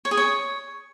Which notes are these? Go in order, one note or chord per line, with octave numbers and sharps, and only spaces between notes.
C#5
G#4
C#5